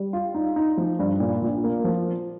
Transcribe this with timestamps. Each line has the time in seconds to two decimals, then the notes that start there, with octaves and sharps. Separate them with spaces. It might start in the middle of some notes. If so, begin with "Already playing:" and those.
Already playing: G3
0.13 F4
0.34 D#4
0.56 D#4
0.77 F3
0.99 G2
1.20 A#2
1.42 A#1
1.64 A#3
1.84 F3